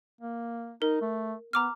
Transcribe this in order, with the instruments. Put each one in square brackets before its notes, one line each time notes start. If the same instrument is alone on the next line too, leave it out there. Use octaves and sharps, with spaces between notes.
[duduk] A#3
[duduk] D#4 [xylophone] A#4
[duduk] A3
[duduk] B3 [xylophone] A#5 D6 F6